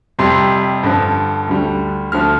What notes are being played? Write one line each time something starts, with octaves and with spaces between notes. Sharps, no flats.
F2 C3 G3 C6
G2 D3 F3
D2 D3 G3
D2 D3 F3 F6